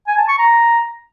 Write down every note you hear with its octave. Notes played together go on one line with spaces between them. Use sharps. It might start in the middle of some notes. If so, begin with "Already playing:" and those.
G#5
A5
C#6
A#5